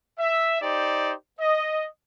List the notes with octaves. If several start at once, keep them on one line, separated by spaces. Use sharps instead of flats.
E5
D#4 G4 C5 D5
D#5